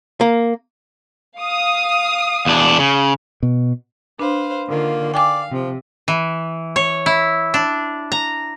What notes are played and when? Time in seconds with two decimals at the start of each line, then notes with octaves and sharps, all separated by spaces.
0.21 A#3
1.40 F5 D#6
2.46 E2 D4
2.79 C#3
3.43 B2
4.19 D4 B4 C5 F5
4.69 D3 D#3 A#3 F4
5.14 D5 F5 G5 G#5 D6
5.51 C3 F3
6.08 E3
6.76 C#5
7.06 E4
7.54 D4
8.12 A#5